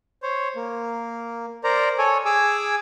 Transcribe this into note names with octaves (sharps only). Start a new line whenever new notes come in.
C5 C#5
A#3
A#4 C5 D5 A#5
A4 C#5 G#5
G#4 G#5 D6 E6